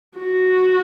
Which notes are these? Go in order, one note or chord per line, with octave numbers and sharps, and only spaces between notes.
F#4